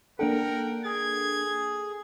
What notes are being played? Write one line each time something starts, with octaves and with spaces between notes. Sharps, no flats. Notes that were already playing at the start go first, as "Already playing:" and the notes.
A#3 D4 A4 A#4 F#5 G5
G#4 G#6